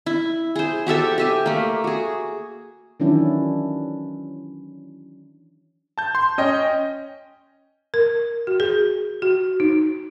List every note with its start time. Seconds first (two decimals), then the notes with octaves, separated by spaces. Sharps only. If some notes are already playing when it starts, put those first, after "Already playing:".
0.06 E4
0.56 G#4 C5
0.87 F#4 G4 A4 E5
1.18 G4 E5 G#5
1.46 A3 A#3
1.84 F#4 G#4
3.00 D#3 E3 F#3 C#4 D4 E4
5.98 A5 G6
6.15 C6
6.38 C#4 C#5 D#5 G5
7.94 A#4
8.47 F#4
8.60 G#4
9.22 F#4
9.60 D#4